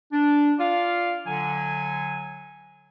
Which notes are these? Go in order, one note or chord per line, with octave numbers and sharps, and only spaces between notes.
D4
F4 D5 F5
D3 F#3 G#5